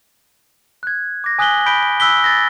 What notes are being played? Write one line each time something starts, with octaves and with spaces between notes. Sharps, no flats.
F#6 G#6
D6 A#6
G#5 D#6 F#6 B6 F#7 G7
B5 G6 B6 D7 G7
B5 E6 F#6 B6 G7
A6 A#6